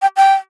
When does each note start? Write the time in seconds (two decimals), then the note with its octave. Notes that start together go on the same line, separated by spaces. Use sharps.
0.02 G5
0.17 G5